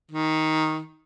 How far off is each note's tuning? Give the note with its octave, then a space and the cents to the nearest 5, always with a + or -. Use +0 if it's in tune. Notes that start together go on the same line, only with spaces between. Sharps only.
D#3 +10